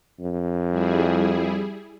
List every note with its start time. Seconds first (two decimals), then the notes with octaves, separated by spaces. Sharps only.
0.20 F2
0.70 G3 E4 G#4